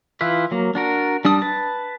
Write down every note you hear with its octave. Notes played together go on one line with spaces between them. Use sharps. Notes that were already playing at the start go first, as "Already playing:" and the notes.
E3 E4 F4 B4
F#3 A#3
D4 F#4 A#4
G3 D4 A5 D#6
B4 A5